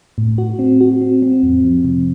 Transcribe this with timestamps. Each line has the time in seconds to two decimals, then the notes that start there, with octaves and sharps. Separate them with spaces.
0.18 A2
0.38 F#4
0.59 C4
0.80 F#4
1.01 C4
1.22 C4
1.43 F2
1.64 F3
1.85 C3